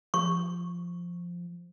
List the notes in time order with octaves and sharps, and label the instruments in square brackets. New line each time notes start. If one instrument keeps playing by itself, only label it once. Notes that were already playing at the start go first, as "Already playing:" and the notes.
[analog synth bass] F3 [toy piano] C#6